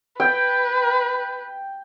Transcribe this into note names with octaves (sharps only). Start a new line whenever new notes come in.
B4 G5